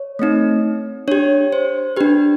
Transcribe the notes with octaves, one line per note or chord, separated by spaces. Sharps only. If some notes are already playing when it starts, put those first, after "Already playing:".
Already playing: C#5
A3 C4 D#4
D4 G4 C#5
C5
D4 G4 B4